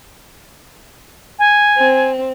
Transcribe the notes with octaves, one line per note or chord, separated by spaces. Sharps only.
G#5
C4